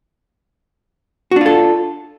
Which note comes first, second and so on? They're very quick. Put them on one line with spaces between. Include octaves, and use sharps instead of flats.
F#4 D4 F4 A4